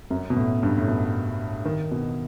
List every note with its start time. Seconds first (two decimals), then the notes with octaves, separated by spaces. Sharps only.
0.10 F#2
0.30 B2
0.36 A2
0.63 G2
0.78 A2
0.88 B2
1.65 D#3
1.91 B2